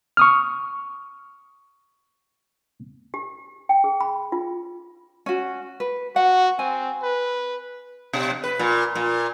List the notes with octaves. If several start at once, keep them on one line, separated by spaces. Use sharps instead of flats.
C#6 D#6 F6
G4
G5
G#4
B5
F4
C#4 F#4
B4
F#4 F#5
C4 G#5
B4
B2
B4
A#2
A#2